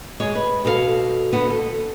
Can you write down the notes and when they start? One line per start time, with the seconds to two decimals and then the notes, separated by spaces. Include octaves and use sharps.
0.20 G#3 C#5
0.35 B4
0.65 B2 A4 B4 F5
1.33 D3 B3 F#4
1.50 A4